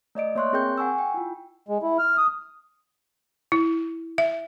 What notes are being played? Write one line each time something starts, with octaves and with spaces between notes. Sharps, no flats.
A3 D5 D#5 D7
A#3 C#5 E5 C6 C#6 F#6
C4 G#4 A#4 G5 G6
F#5 G#5 C#6 E6
G5
E4 F4
G#3
E4
F6
D#6
E4
E5